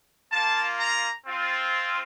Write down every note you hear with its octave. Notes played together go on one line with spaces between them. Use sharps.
A#3 F4 A5
A#5
C4 F4